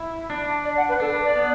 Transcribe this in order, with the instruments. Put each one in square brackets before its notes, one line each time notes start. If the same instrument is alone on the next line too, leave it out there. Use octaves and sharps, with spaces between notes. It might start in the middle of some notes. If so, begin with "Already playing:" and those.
Already playing: [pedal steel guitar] E4
D4
[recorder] D5
F#5
B4
[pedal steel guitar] D4 [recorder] A4
[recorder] B4
D5
[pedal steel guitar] B3